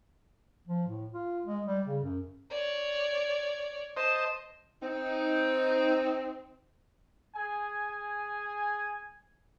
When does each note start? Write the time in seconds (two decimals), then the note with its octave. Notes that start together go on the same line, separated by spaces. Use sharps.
0.67 F3
0.87 A2
1.13 F4
1.46 G#3
1.66 G3
1.86 C#3
2.04 F#2
2.50 C#5 D5
3.97 C5 D#5 A5
4.83 C4 D#4
7.35 G#4 G#5